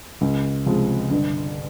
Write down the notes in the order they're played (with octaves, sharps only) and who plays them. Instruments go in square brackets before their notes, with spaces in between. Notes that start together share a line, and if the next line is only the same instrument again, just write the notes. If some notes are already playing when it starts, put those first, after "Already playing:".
[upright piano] C#2
C3 F3 G#3
G1